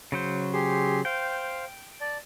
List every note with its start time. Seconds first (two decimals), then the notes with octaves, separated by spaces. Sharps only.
0.12 C#3 F#3 C5
0.53 G4 G#4 C6
1.05 C5 F5 G5
2.01 D5 A5